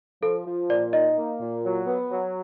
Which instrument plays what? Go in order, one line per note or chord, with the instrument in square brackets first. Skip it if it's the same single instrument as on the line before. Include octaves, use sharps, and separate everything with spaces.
[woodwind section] F3 [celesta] A4
[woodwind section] F3
[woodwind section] A#2 [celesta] D5
[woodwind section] D#4 [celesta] D#5
[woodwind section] A#3
A#2
F#3
B3
F#3